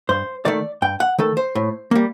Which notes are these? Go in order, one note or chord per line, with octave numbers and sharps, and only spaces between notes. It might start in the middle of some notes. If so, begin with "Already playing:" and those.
G2 C5
D#3 A3 D5
G2 G5
F#5
D#3 A3 A4
C5
A2
G3 A#3